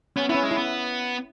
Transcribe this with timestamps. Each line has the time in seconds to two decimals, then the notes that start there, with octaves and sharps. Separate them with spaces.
0.16 B3 C#4
0.29 B3 E4
0.34 C#4
0.43 G#3
0.51 E4
0.57 B3